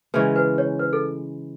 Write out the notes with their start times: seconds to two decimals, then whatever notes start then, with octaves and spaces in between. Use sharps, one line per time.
0.14 C#3 E3 G#3 C#4 B4
0.36 B4
0.58 C#5
0.79 B4
0.93 A4